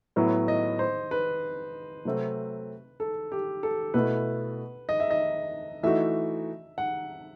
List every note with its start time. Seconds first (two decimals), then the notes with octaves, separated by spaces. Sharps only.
0.16 A2 F#3 B3 E4
0.48 D#5
0.79 C5
1.11 B4
2.05 C3 F#3 A3 C4
3.00 A4
3.32 G4
3.63 A4
3.94 B2 A3 E4 B4
4.89 D#5
5.00 E5
5.11 D#5
5.83 E3 A3 D#4 F#4 E5
6.78 F#5